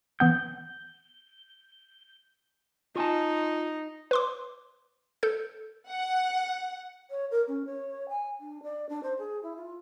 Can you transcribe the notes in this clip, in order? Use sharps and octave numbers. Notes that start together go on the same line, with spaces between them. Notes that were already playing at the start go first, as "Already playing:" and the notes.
E3 B3 F#5 G6
D#4 F4 G#5 A5
B4 C6 D6
A4 G6
F#5
C#5
A#4
C#4
C#5
G#5
D4
D5
D4
C5
G#4
E4
F4